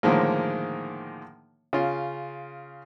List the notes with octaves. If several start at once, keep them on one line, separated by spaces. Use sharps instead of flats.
A2 D3 D#3 F3 G#3 A#3
C#3 F4